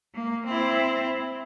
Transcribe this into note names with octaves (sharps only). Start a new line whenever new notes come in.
A#3
C4 E4